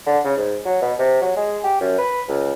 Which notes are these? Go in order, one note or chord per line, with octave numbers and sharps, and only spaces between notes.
D3
C#3
G#2
F#3
B2
C3
F#3
G#3
G4
F#2
B4
C#2